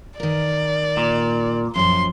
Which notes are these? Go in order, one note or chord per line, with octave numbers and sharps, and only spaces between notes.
D#3 A#4 D5
A#2
F#2 A#2 F3 C6